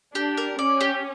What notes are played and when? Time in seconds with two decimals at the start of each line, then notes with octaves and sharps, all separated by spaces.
0.15 D4 G4
0.37 A#4
0.59 C#4 D5
0.81 G4